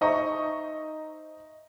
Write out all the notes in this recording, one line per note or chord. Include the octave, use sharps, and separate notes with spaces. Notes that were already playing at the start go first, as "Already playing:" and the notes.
D#4 C5 D#5 E5 A#5 C#6